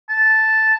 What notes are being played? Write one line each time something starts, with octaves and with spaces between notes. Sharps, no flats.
A5